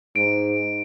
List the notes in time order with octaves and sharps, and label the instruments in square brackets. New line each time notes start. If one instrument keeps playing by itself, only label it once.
[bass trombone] G#2 [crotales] D7